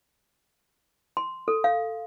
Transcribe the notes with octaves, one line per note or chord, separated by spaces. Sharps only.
C6
A4
F5